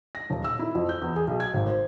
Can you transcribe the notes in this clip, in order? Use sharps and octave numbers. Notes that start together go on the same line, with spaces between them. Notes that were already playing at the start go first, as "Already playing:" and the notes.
A#6
D#1
E6
E4
F2
G6
E2
G#4
B1
G#6
G#1
C5